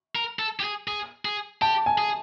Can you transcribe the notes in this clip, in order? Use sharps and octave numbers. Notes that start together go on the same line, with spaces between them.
A#4
A4
G4
G#4
G#4
G#4
G4 A5
G#5
G#4